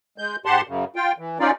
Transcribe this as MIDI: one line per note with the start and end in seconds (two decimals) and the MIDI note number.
0.18 0.36 56
0.18 0.36 91
0.46 0.61 44
0.46 0.61 67
0.46 0.61 78
0.46 0.61 81
0.46 0.61 84
0.67 0.85 42
0.67 0.85 49
0.96 1.12 65
0.96 1.12 79
1.18 1.38 52
1.40 1.51 61
1.40 1.51 63
1.40 1.51 65
1.40 1.51 74